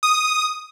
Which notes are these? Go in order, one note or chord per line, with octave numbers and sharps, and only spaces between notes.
D#6